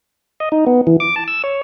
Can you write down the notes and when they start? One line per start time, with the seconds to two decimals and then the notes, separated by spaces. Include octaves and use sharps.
0.40 D#5
0.52 D#4
0.67 B3
0.87 E3
1.00 D6
1.16 A5
1.28 E6
1.44 C#5